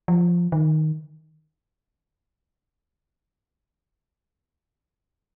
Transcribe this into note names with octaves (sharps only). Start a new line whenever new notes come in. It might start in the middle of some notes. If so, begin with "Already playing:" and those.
F3
D#3